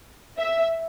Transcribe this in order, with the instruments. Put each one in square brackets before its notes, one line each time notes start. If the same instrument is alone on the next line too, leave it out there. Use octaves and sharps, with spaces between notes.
[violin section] E5